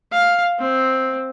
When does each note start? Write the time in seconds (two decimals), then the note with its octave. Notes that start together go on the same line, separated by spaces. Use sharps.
0.12 F5
0.59 C4